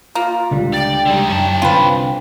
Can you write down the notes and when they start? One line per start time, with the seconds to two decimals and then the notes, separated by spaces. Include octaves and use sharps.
0.15 A#3 F4
0.51 C#2 D3 G3
0.73 D5 G5
1.06 C#2 D3 G3 D#4
1.29 F#2 C#4 A5
1.62 C2 D3 C4 F4 B4